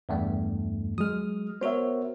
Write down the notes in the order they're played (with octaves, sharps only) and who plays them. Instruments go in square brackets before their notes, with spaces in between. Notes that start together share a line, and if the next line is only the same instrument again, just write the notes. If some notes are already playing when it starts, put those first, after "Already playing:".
[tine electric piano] E2 G2 A3
[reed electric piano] F#3 G#3 [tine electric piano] D#6 F6
[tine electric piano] B3 F#4 A#4 [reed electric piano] C5 C#5 E5